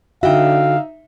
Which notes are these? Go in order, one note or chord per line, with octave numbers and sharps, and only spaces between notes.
D3 D#4 F#4 E5 F5 G5